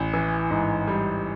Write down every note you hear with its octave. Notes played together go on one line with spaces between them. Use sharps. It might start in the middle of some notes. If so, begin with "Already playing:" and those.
Already playing: A1
E3
G#2
G3